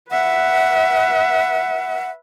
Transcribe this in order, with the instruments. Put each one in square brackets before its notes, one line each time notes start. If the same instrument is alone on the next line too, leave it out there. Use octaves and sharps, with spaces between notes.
[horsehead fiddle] B4 E5 [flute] F#5